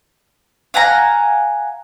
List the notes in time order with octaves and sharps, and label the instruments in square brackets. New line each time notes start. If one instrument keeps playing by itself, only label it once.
[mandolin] F5 F#5 G#5 A#5